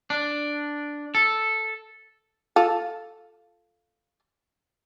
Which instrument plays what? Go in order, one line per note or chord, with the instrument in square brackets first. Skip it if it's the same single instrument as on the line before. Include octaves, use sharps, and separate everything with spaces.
[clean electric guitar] D4
A4
[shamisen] F4 A4